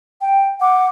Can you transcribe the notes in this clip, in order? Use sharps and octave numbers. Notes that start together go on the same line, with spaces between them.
G5
F#5 D6